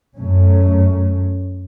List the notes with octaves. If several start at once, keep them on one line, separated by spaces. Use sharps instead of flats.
F#2 A3 C#4